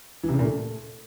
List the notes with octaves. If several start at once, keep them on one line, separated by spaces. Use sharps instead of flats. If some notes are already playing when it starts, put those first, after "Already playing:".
E3
C3
C#3
A#2
A3